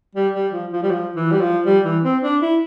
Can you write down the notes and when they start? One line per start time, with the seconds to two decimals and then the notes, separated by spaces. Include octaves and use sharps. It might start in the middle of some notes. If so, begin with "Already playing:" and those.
0.15 G3
0.34 G3
0.53 F3
0.72 F3
0.83 G3
0.91 F3
1.16 E3
1.32 G3
1.41 F3
1.66 G3
1.85 E3
2.04 C4
2.23 D4
2.42 E4